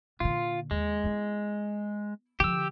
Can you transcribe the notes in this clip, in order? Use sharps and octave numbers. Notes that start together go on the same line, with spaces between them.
A#2 D3 F4
D#2 G#3
B3 E4
D3 F3 G4 E6